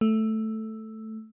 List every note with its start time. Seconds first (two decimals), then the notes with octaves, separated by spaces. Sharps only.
0.01 A3